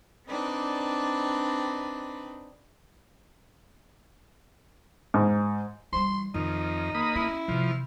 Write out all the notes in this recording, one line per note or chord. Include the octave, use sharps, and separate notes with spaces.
C4 D4 D#4 B4 D5
G#2
E3 G3 C6
F2 D#3 D#4
A#3 B5 D#6
C#4 E4
C3 E3 F3